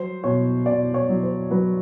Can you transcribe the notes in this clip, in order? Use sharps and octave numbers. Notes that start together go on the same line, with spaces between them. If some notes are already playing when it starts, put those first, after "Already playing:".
Already playing: F#3 C5
B2 C#5
B2 D5
C#5
F#3
C5
F#3 B4